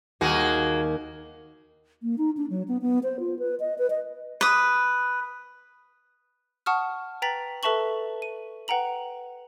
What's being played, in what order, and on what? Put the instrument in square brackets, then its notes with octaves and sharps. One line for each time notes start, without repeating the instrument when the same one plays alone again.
[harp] D#2 [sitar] A#3 F#4 G#4
[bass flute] A#3
D#4
D4
F#3
B3
B3
C5
F4
B4
D#5
B4
D#5
[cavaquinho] B4 D#6
[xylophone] F#5 A5 C#6 D#6 F6
B4 G5 A#5 A6 B6 F#7
A4 B4 E5 A5 C#6 F#7
D#7
B4 F#5 G5 A#5 F#7